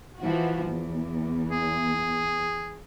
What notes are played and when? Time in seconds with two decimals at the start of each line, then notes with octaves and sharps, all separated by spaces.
0.18 E3 F3 F#4
0.65 E2
1.50 G#4